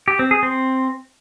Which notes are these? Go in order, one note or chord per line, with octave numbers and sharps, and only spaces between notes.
G4
C4
G#4
C4